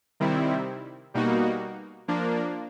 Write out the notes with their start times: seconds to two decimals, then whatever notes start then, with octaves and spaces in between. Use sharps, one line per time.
0.20 C3 D#3 G3 C4 E4
1.14 B2 G3 A#3 D#4 F#4
2.08 F3 A#3 D4